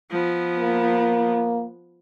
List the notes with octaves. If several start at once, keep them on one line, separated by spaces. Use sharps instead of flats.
F3 B3
A#3